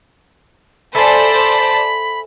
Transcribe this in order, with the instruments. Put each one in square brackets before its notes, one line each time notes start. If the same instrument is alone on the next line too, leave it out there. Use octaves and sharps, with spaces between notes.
[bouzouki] A4 E5 G#5 [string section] C5 D5 A5 [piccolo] B5